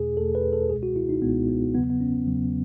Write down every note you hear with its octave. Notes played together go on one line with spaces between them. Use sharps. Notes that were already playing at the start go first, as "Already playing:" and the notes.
Already playing: E2 B2 A3 G#4
E2 B2 A3 A4
B4
A4
C#2 B2 G#3 G#4
F#4
E4
D#4
C#2 B2 G#3 B3
B3
E2 C#3 F#3 B3
B3
C#4
E2 C#3 F#3